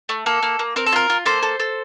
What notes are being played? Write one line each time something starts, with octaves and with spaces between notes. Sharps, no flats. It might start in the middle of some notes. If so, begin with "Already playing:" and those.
A3
A#3 A4
A#3
A#3
C4 A#4
A4
F4 A#4
F4
A#3 A4 C5
A4
A4